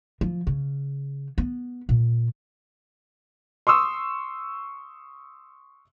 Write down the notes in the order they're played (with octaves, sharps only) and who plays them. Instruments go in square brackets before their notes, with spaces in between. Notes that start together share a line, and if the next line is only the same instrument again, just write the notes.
[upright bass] F3
C#3
B3
A#2
[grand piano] C6 C#6 D#6 E6